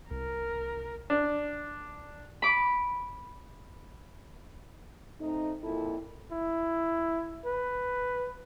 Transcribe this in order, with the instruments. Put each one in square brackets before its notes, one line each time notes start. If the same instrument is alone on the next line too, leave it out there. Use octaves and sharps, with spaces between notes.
[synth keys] C2 [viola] A#4
[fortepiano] D4
[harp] B5 D6
[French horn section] A3 C4 D#4
F2 A#2 E4 A4
[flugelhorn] E4
B4